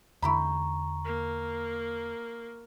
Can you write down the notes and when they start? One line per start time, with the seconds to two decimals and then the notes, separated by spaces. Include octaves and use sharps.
0.22 E2 D3 E4 G4 A#5 B5 C#6
1.04 A#3